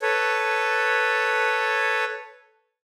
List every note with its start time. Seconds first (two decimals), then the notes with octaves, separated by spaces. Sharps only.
0.02 A4 B4 C#5